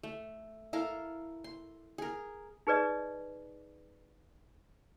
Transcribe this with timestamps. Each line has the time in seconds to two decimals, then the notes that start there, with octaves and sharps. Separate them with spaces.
0.03 A3
0.73 E4 A4 A#4 F5
1.44 C6
1.98 G#4 A#4
2.67 D#4 G#4 B4 D5 D#5